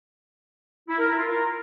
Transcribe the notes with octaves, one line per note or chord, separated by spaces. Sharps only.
E4
A#4
E4
F4
A#4